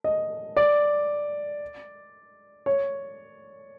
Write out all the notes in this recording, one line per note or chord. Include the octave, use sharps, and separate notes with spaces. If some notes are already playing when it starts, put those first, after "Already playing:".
D#5
D5
C#5